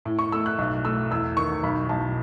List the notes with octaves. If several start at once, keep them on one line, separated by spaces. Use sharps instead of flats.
A2
C#6
A3 E6
F#6
B1
A3 E6
E2 E6
D#3 C#6
B1 B5
B1 A5